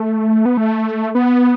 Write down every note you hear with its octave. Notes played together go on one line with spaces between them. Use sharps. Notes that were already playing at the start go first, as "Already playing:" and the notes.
Already playing: A3
B3
A3
B3